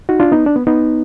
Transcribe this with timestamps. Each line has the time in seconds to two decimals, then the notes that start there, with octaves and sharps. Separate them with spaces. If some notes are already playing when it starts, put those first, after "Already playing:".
0.09 D#4 F#4
0.20 D4 F4
0.32 B3 D#4
0.46 D4
0.56 B3
0.67 B3 D#4